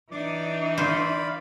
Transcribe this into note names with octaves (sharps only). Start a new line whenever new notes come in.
E3 D4 D#4 D5 D6
C5 D5 F5 B5